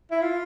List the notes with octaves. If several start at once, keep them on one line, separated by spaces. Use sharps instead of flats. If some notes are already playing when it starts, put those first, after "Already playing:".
E4
F4